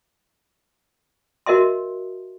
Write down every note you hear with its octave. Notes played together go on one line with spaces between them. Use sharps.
F#4 A#4 D#5 E5 C6